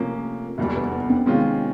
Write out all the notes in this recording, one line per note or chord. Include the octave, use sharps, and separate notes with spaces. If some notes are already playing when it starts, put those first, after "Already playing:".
Already playing: C3 F3 A3 A#3 C#4
F1 E2 B2 G3 A#3
B3
B3
C4
C3 D#3 G#3 C#4 F4